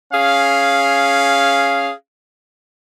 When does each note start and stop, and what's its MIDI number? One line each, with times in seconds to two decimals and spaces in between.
0.13 1.92 61
0.13 1.92 68
0.13 1.92 77